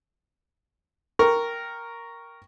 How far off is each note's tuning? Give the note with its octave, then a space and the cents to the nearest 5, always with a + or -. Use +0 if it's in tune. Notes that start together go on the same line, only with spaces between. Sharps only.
A#4 +0 G5 +0 C#6 +0